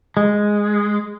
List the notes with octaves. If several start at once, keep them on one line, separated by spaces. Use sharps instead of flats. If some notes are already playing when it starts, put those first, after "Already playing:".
G#3